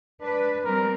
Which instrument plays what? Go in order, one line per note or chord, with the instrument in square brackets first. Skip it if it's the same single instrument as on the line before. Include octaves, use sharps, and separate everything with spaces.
[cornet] D4 [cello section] B4
[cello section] G3 C4 [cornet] A#4